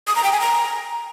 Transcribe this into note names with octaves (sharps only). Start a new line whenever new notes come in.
D#6
A#5
G5
G#5
A#5